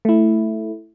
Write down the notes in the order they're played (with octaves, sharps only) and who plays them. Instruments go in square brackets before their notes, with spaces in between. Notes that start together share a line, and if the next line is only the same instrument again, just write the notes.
[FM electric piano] A3 E4